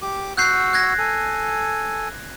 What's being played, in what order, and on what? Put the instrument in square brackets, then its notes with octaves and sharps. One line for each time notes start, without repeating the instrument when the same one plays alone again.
[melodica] G4 D6
[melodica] F#4 F#5 E6 [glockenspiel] F#6 G6 C7
[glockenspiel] F#6 G#6 A#6
[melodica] A4 G#5